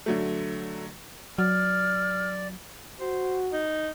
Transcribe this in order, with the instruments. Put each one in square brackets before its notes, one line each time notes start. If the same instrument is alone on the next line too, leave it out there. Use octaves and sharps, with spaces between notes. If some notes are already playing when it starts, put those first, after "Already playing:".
[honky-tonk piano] D3 F#3 A3
[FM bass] F#3 [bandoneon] D5 [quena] F6
[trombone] F#4 [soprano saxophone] C5
[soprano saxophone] D#4